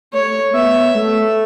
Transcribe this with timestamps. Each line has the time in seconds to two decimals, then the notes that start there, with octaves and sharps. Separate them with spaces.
0.13 A3 C#5
0.54 B3 E5
0.95 A3